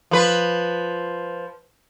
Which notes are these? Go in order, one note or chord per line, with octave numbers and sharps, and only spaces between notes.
F3 B4